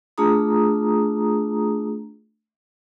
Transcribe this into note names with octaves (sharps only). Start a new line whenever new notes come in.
A3 D4 F4 G#4 A#5 D#6